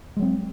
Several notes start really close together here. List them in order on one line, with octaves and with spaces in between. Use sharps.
G#3 F#3 C4